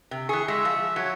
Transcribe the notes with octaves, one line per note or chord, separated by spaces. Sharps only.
C3
E3 G#4 C#6
G#3 E5
F3
F#3 C#5